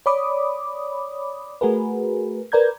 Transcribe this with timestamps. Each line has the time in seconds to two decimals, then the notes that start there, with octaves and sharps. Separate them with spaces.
0.06 C#5 D5 B5 D6 D#6
1.61 A3 F#4 G#4 A#4 B4
2.52 A#4 B4 D5 A#5 G6 G#6